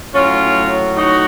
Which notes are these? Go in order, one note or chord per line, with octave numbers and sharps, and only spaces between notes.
A2 F#3 C#4 F4
D#4 F#4